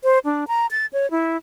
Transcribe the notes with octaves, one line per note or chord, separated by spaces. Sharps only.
C5
D4
A#5
A6
C#5
E4